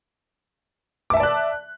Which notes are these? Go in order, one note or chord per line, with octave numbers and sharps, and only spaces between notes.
D5 E5 A5 D6 F#6